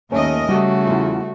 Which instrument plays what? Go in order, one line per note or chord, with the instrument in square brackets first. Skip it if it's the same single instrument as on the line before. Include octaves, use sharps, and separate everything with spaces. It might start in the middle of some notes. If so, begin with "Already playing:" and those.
[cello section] D#2 A#4 D#5 [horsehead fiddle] A3 [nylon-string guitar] C#4
[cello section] C#3 [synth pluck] G3 [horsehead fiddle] A3 F#4
[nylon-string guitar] E2 F4